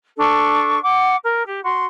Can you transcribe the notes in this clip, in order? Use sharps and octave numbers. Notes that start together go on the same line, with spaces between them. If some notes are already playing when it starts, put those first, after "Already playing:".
D4 A4 C#6
F#5 D6
A#4
G4
F#4 C6